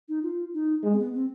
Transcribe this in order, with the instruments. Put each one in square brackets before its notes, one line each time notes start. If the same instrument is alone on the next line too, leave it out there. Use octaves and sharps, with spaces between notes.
[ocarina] D#4
F4
D#4
[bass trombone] G#3
[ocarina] C4
B3
C4